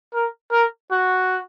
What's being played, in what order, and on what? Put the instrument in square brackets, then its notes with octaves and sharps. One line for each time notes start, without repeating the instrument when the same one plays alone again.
[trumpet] A#4
A#4
F#4